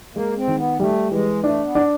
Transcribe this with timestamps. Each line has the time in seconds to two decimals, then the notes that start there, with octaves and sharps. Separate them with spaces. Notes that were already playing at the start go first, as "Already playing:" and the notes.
0.15 G#3 A#3
0.37 C4
0.48 D#3
0.58 B3
0.79 G3 A3
1.11 E3 G#3
1.43 A3 D4
1.64 B3
1.75 D4